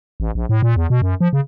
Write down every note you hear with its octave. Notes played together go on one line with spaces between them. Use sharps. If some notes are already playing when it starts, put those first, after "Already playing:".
A1
A#1
A2
A#2
E2
B2
F#2
F3
C#3